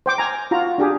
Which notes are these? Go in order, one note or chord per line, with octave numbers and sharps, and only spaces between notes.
C5 G5 D6
G#5 A#5
F4 F#4 A#5
D4 G4 G#4